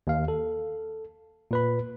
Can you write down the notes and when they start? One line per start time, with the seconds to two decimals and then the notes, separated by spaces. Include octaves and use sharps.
0.07 D#2 F5
0.28 A4
1.51 A#2 B4 B5